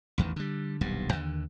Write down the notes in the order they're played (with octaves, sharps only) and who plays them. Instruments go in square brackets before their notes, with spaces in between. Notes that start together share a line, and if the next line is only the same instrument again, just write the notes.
[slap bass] A1 E2 D#3
D3 G3
D#1 B1 G2 G3
D#2 D3